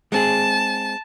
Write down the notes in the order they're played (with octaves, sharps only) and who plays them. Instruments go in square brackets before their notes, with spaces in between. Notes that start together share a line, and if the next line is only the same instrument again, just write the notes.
[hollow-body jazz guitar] G#3 C4 G#4 [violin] A5